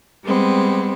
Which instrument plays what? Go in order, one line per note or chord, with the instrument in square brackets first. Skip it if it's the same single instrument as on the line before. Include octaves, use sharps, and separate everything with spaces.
[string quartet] G3 G#3 B3 C4